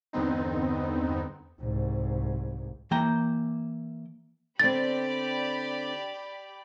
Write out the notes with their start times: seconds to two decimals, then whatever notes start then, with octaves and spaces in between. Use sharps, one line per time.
0.13 E2 G2 D3 B3 C4 D#4
1.60 C2 G#2
2.91 E3 A#3 G5 A#5
4.60 D3 C4 G4 D5 B5 A6